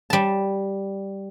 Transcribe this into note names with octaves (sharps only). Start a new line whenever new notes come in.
G3 A5